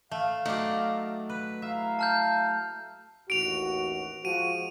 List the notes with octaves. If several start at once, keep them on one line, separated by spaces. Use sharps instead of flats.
A3 F5
F#3 A3 D#4 D5
B4
E4 E5 F5 A#5
A5 F6 G6
A1 D#2 F#4 D7 F7
F3 G#3 F#4 D#7